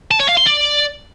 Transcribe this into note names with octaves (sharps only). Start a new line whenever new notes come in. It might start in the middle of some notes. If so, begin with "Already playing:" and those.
A5
C#5
F5
C6
D5